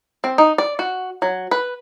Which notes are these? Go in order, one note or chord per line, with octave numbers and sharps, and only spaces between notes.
C4
D#4
D5
F#4
F#3
B4